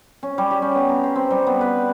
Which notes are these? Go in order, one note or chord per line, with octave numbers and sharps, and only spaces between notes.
C#4
G3
G4
C#4
B3
A#5
C5
C4
G3
B3
B4
G4